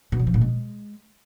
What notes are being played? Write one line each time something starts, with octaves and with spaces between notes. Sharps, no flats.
B2
F#3
F3
A#2
G#3